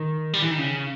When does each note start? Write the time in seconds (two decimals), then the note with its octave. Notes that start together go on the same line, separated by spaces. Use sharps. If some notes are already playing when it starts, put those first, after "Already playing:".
Already playing: D#3
0.34 G3
0.42 E3
0.51 D#3
0.59 C#3